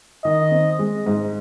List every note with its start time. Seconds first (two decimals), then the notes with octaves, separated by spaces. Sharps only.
0.24 D#3 D#5
0.51 C4
0.79 G#3
1.06 G#2